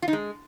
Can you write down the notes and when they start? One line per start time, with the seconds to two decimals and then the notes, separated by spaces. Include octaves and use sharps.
0.02 F4
0.08 D#4
0.13 G#3